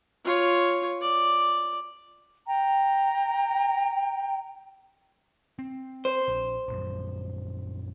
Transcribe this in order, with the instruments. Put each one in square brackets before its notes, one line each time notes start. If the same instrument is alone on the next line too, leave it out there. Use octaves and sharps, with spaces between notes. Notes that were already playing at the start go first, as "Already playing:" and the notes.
[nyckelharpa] F4 C#5
D5
[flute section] G5 A#5
[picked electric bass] C4
[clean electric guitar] C5
[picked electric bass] A#1
A#1 F#2